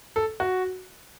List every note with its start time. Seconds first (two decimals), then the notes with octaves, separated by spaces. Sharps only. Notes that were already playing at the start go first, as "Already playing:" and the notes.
0.16 A4
0.40 F#4